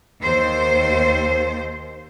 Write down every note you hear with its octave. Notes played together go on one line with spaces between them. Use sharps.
D#2 C5